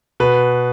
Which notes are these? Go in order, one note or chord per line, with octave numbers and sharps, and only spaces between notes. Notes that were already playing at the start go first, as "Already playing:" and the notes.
B2 B4